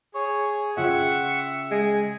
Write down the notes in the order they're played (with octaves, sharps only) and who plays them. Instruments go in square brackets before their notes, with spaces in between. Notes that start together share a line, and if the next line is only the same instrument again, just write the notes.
[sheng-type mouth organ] G#4 [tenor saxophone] C#5
[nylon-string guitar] C#3 F4 G5 [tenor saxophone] E5 [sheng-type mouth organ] F#5 C#6
[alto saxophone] G#3 [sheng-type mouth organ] G#4